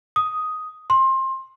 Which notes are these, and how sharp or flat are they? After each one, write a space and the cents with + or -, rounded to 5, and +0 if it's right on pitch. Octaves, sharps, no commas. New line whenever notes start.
D#6 +5
C6 +20